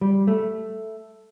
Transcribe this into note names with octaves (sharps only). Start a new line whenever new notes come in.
G3
A3